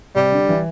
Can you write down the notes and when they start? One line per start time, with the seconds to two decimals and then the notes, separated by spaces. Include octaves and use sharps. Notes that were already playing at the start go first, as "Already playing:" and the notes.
0.16 C3 G3
0.32 D3
0.49 E3